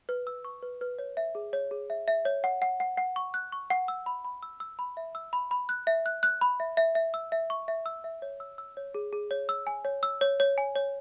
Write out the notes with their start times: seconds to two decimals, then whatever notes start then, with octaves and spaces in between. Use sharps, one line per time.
0.09 B4
0.27 E6
0.45 C#6
0.63 B4
0.81 B4
0.99 C#5
1.17 E5
1.35 G#4
1.53 C#5
1.71 G#4
1.90 E5
2.08 E5
2.25 C#5
2.44 F#5
2.62 F#5
2.80 F#5
2.97 F#5
3.16 C#6
3.34 F#6
3.52 C#6
3.70 F#5
3.88 E6
4.06 B5
4.25 B5
4.43 E6
4.60 E6
4.79 B5
4.97 E5
5.15 E6
5.33 B5
5.51 B5
5.69 F#6
5.87 E5
6.06 F#6
6.23 F#6
6.41 B5
6.60 E5
6.77 E5
6.95 E5
7.14 E6
7.32 E5
7.50 C#6
7.68 E5
7.86 E6
8.04 E5
8.22 C#5
8.40 E6
8.58 E6
8.77 C#5
8.95 G#4
9.13 G#4
9.31 C#5
9.49 E6
9.67 G#5
9.85 C#5
10.03 E6
10.21 C#5
10.40 C#5
10.58 G#5
10.75 C#5